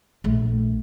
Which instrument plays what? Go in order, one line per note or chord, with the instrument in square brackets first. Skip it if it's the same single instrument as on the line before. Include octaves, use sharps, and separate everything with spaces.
[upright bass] A#1 A3